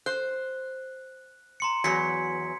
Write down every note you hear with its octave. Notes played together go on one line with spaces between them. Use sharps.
C5 F#6
A#5 C6 C#7
E2 F#3 G#6 B6 C#7